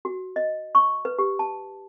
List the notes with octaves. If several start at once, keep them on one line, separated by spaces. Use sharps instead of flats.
F#4
D#5
C#6
B4
G4
A5